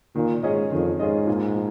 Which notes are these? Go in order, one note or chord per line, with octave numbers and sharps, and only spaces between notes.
A#2 D#3
G#2 C#4 F4 G#4 D#5
F2 D#3
G#2 C#4 F4 G#4 D#5
A#2
F3